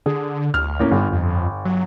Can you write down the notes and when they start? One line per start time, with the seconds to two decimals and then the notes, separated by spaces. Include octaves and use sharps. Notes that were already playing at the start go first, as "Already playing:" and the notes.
0.06 D3 G#4
0.54 D2 F6
0.79 A2 A#3 C#4
0.91 G1 G2
1.12 F2
1.65 F#3